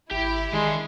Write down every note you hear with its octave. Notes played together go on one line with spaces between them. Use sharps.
G#1 E4 G4
D#3 G#3 D4 C6